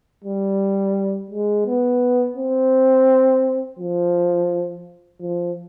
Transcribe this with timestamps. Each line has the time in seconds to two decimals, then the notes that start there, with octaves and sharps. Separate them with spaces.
0.24 G3
1.31 G#3
1.66 B3
2.37 C4
3.79 F3
5.20 F3